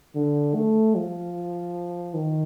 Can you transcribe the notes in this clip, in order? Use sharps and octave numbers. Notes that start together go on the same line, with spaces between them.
D3
A3
F3
D#3